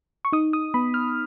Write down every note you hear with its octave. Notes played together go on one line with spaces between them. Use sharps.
C#6
D#4 D#6
D#6
B3 B5
F6